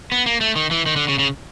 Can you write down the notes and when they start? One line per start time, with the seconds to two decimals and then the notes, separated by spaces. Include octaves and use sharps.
0.12 B3
0.26 A#3
0.41 A3
0.56 D#3
0.71 E3
0.86 D#3
0.96 D3
1.08 C#3
1.19 C#3